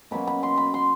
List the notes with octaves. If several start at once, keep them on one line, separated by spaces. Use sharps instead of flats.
B2 F#3 A#3 C#4 B5
B5
C6
B5
C6